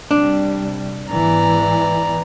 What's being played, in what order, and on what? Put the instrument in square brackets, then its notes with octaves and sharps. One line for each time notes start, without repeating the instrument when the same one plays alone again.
[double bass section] C3 G3 [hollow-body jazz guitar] D4
[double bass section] G#2 E3 B3 [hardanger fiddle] D5 A#5